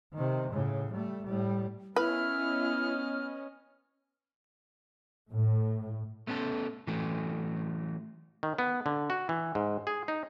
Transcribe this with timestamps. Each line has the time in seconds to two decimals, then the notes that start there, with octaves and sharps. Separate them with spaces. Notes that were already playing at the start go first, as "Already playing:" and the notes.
0.13 C3 D#3
0.51 A2 C#3
0.93 G3 A3
1.24 A2 G3
1.96 B3 C#4 E4 B4 D#5 F6
5.31 A2
6.27 A3 B3 C#4 D4 A4
6.87 E3 F#3 A3
8.43 D#3
8.58 B3
8.86 D3
9.10 F#4
9.29 E3
9.55 G#2
9.87 G#4
10.08 D#4